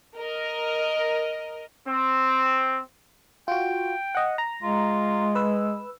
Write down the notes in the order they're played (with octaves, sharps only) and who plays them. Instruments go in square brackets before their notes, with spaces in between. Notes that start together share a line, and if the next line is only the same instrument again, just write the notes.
[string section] A#4 D#5
[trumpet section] C4
[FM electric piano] F4 F#4 [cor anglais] G5
[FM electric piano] D#5 F#5
A#5
[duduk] G#3 [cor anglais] F4
[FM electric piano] B4 E6